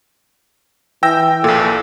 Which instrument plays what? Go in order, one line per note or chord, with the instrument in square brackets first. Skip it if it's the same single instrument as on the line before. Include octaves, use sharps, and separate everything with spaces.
[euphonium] E3 [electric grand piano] G5 E6 A#6
[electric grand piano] A#1 A#2 [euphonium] A4